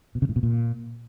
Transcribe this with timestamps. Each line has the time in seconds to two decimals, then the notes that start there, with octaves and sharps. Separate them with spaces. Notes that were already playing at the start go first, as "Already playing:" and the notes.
0.15 B2
0.22 C#3
0.29 A2
0.36 B2
0.43 A#2